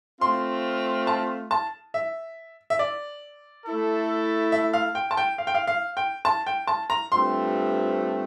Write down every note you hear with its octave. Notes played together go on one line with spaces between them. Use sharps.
A3 C4 F4 C6
A5
A5
E5
E5
D5
A3 E4 A4
E5
F5
G5
A5
G5
F5
G5
F5
F5
G5
A5
G5
A5
A#5
G2 F3 A3 C4 C6